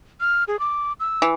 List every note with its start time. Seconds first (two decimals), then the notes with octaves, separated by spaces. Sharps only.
0.21 F6
0.48 G#4
0.59 D6
1.00 E6
1.22 E3